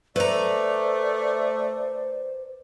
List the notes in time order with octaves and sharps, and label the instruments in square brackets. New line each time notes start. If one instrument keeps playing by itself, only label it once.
[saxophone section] A3 [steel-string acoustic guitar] B4 A#5 [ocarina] C5 [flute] D5